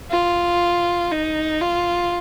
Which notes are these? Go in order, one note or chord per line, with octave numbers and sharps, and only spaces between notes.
F4
D#4
F4